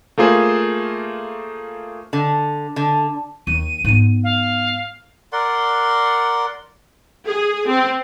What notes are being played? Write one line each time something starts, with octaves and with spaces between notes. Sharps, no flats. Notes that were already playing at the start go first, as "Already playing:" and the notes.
A3 A#3 F4 G#4 C5
D3
D3
D#2 D#7
G#2 B3
F5
A#4 D5 F#5 C6
G#4
C4